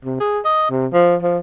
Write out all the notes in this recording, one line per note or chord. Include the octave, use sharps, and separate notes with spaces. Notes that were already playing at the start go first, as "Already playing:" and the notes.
C3
G#4
D#5
C3
F3
F3